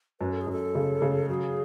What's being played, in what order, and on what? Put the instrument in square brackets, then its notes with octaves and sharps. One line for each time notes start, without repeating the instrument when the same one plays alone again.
[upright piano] F#2 [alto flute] B4
[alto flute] A4
G#4
[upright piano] F#2 [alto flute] A4
[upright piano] C#3
C#3
[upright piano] F#3 [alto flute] G#4